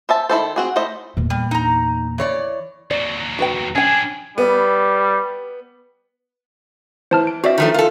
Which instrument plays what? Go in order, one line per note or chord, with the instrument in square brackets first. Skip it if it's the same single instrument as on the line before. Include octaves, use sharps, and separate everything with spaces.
[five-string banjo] C5 E5 A5
D#3 E4 A4 C5
C4 F#4 G#4
A3 E4 C5 D#5
[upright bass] E2 A#2
[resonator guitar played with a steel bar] G3
D#4 A#5
E3 C#5 D5
[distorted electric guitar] D#2 F#3 [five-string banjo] D5
[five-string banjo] F#4 B4 G5
[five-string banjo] C#4 G5 [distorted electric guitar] D4 G#4 [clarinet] G#5
[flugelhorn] G3 [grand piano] B3
[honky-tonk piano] E3 [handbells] C5 A5 F6
[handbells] D7
[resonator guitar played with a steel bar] C4 [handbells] F#4 D5 E5
[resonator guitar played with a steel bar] D#3 F3 A3
[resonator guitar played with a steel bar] F4 A4 [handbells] A#4